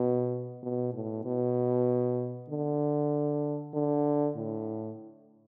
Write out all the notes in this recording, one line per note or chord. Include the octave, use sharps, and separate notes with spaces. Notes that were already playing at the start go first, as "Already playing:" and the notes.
Already playing: B2
B2
A2
B2
D3
D3
A2